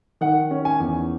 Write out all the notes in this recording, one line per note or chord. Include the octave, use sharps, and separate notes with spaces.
D#3 F#5
C#4
G#5
E2